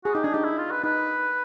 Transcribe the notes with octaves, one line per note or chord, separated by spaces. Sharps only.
F#4 G#4
D#4 G4
D4 G#4
D#4 G4
E4
F4
B4
D#4 B4